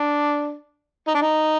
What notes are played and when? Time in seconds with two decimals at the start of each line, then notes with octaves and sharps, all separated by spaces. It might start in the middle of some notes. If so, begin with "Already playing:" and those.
Already playing: D4
1.07 D#4
1.15 D4
1.22 D#4